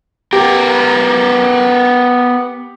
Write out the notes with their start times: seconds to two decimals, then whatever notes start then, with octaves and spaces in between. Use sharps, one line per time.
0.33 B3 G4 A#4